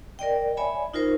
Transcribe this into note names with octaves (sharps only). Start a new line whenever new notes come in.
A#4 D5 D#5 G5
C#5 D5 E5 G#5 B5
D#4 F4 A#4 C5